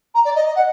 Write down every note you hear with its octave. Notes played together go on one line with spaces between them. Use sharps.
A#5
D5
D#5
D#5
F#5